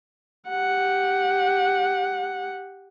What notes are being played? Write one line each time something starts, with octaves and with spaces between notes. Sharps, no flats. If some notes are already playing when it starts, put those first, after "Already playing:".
G4 F#5